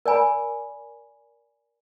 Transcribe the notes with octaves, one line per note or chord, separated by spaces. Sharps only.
A#4 D5 G#5 B5